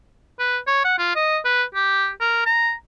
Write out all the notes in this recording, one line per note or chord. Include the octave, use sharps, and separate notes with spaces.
B4
C#5
F#5
F4
D#5
B4
G4
A#4
A#5